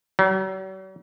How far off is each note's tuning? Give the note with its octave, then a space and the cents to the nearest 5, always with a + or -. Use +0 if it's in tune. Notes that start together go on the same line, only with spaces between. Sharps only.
F#3 +45